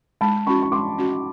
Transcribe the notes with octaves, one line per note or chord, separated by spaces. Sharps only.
G#3 A5 B5
C#4 F#4 B5 C#6
C#6
G#3 C6 D6
C#4 F#4